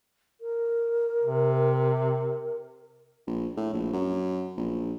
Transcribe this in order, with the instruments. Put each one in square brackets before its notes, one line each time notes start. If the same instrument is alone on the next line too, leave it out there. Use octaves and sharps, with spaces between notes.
[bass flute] A#4
[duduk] C3
[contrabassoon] A#1
A2
A#1
F#2
A#1